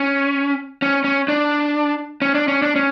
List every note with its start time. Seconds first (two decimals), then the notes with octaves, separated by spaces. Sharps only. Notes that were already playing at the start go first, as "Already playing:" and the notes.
Already playing: C#4
0.82 C#4
1.04 C#4
1.28 D4
2.22 C#4
2.35 D4
2.48 C#4
2.62 D4
2.76 C#4